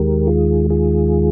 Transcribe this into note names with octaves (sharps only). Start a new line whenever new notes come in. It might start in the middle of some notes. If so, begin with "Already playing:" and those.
Already playing: D#2 D#3 G#3 G4 A#4
F4 G#4
F4 G#4